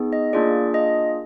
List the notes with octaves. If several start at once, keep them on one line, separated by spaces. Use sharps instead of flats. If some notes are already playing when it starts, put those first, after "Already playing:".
Already playing: B3 D#4 G#4
D#5
A#3 D4 F4 G#4 D5
D#5